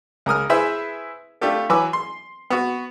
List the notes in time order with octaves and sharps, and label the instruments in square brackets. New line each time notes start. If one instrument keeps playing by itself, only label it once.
[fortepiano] C#2 A#4 D#6 F6
E4 G#4 B4 C5 E5
A3 D4 F4 G4 A4
E3 F#3 B4 G#5 D6 E6
C6
B3 F#4